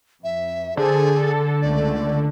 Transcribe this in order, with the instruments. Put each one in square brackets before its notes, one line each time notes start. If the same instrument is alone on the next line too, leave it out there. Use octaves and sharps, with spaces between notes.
[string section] F2 [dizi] E5
[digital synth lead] D3 [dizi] G#4 [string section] A4 C5
[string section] A4
[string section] C#2 A3 [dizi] D5